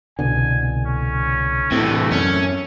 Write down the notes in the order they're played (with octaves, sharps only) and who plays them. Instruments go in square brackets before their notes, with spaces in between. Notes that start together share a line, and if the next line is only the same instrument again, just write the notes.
[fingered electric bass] C2 B2 D3 [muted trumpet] G#5
[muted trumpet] C#4
[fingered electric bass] A2 [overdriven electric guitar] C3 E3 [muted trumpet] A3
[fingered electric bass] F#2 [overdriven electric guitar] C#4